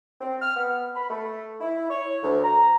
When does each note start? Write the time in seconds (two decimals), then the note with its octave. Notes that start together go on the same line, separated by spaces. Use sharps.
0.21 C4
0.41 F6
0.56 B3
0.96 B5
1.10 A3
1.60 E4
1.89 C#5
2.23 D2
2.44 A#5